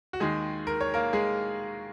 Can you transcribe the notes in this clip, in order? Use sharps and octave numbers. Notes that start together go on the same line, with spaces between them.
F#4
D#2 D#3 G#3 G#4
A#4
C#5
A#3 A#4
G#3 G#4